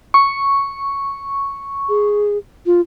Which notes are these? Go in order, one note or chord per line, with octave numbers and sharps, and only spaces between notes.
C#6
G#4
F4